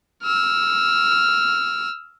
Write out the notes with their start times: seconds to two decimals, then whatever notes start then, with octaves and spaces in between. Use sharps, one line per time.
0.23 E6 F6